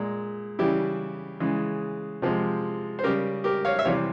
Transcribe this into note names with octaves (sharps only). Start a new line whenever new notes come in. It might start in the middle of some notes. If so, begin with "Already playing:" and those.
Already playing: A#2 G#3
C#3 E3 G3 E4 G4
C#3 E3 G#3
C3 F3 G#3
C5
C#3 G3 G4 A#4
G4 A#4
C#5 F5
E5
C3 E3 G3 C#5 F5